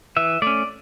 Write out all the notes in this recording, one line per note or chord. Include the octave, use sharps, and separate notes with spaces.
E3 E5
A3 C#4 D5